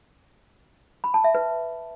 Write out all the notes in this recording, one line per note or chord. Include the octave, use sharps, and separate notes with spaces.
B5
A5
E5
B4